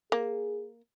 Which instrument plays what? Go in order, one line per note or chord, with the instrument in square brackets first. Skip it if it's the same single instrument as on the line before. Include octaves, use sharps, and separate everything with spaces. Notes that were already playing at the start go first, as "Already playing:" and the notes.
[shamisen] A#3 [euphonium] G#4